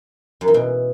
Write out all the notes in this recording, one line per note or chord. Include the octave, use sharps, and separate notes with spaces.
F#2
E3
B2